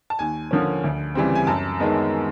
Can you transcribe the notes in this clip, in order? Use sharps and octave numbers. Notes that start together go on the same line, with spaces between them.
A5
D#2 G#5
D3 F3 A#3 C#4
D2
C#3 E3 G3 C4
G#5
F#2 A5
D#3 G#3 B3